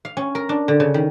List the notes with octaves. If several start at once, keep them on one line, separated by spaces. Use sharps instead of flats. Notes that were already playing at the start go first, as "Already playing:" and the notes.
F5
C#4
A#4
D4
D3
C#3
D#3